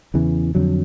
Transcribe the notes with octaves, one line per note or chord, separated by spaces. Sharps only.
E2 C#3 E3
F2 D3 F#3